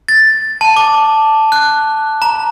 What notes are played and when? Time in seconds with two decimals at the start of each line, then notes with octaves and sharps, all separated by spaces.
0.08 A6
0.61 A5
0.76 D6
1.52 F#6
2.22 A#5